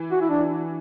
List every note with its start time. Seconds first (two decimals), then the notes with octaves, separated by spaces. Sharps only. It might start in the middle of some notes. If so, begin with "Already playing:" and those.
Already playing: E3
0.11 F#4
0.22 E4
0.30 D4